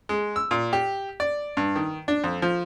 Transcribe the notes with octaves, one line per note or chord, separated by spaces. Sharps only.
G#3
E6
A#2
G4
D5
G2
D#3
D4
F2
F3